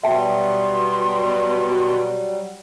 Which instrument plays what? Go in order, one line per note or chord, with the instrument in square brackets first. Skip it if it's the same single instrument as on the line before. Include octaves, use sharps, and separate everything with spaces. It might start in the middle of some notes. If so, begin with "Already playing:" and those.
[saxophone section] B2 [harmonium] F#3 G3 [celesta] E5 G5 A5 [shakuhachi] C6